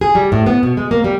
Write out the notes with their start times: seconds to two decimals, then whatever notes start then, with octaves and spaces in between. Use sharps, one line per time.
0.01 G#4
0.15 G3
0.32 A2
0.46 B3
0.63 B2
0.77 G#3
0.91 A#3
1.04 G3